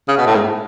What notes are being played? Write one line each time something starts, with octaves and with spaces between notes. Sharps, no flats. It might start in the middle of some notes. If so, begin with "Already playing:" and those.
C#3
B2
A2
G#2